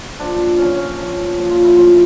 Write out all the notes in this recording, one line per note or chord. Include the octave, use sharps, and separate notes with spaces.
A#2 F3 D4
A#2 F3 C#4
C#4
A#2 F3
A#2 F3
F4
E4
A2 F3 F4